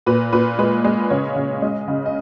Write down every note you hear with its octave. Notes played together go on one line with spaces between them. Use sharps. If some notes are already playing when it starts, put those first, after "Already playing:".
A#2 B4
A#2 B4
G#3 B4
G#3
C#3 C#5
C#3
G#3 D#5
C#3
D#5